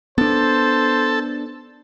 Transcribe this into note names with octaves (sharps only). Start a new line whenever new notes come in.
B3 D4 A4 C5